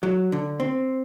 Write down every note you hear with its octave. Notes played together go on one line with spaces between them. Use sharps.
F#3
D3
C4